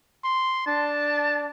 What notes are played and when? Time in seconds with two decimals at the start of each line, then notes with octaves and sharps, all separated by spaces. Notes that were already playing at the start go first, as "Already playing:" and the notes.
0.24 C6
0.67 D4 A5